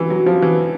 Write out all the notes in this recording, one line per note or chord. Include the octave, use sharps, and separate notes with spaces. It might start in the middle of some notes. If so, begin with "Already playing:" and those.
Already playing: E3
F#3
F3
E3